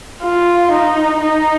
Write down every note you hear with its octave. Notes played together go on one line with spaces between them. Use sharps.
F4
D#4
D#4